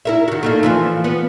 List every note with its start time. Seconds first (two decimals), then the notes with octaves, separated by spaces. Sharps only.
0.05 E4 A#4 E5
0.28 D#3 F#4
0.43 A3 A#3 D#4
0.63 E3 F3 F4
1.04 B3